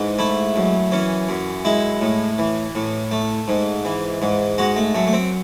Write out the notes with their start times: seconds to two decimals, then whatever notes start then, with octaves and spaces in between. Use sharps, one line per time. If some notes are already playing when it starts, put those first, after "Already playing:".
Already playing: G#2 E3
0.19 A3 E4
0.56 F#2
0.92 E3 C#4
1.29 F#2
1.65 G#3 E4
2.01 A2
2.39 E3
2.75 A2
3.11 A3
3.48 G#2
3.85 E3
4.22 G#2
4.58 G#3 F#4
4.76 A3
4.95 F#2 A3
5.07 A3
5.13 C4